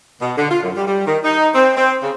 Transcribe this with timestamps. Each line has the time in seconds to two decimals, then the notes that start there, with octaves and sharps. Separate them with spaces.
0.21 B2
0.38 D3
0.51 F4
0.63 F#2
0.76 G3
0.87 G3
1.06 D#3
1.24 D#4
1.55 C4
1.77 C4
2.03 C#3